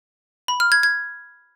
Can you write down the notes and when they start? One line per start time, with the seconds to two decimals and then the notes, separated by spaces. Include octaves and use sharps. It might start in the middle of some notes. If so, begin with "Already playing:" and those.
0.48 B5
0.60 F6
0.72 G#6
0.83 G#6